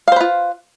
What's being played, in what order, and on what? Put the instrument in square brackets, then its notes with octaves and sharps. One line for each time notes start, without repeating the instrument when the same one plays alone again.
[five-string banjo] F5
C5
B4
F4